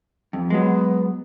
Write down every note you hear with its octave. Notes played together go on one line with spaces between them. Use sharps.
F2
F#3 G#3 B3